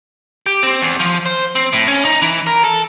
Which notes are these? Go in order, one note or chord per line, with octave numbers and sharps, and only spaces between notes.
G4
C4
E2
F3
C5
C4
A2
C#4
D#4
E3
A#4
A4